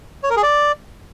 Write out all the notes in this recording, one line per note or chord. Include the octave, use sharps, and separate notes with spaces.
C#5
A#4
G#4
D5